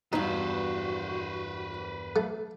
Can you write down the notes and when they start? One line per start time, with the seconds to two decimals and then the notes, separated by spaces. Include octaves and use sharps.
0.13 E2 G2 D#4 F#4 B4 C5
2.16 A3